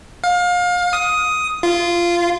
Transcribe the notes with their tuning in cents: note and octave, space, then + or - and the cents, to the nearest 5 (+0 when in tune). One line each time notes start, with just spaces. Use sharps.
F5 +30
D#6 +10
F4 -15